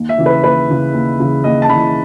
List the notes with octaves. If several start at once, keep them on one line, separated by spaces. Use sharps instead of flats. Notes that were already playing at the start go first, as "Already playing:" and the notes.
Already playing: D#2
E5
C#3 E3
B4
D#2 B4
C#3 E3
D#2
C#3 E3
D#2 D#5
A5
C#3 E3 B5